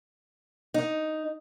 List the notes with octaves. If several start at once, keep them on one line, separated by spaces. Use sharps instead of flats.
D#4